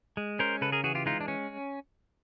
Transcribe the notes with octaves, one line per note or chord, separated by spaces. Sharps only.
G#3
C#4 A#4 C5
C#3 A4 B4
G#4 A#4
E3 F#4 G#4
F4 G4
G#3 D#4 F4
D4
C#4